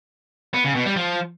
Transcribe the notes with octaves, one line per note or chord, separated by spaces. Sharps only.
B3
C#3
B2
G3
F3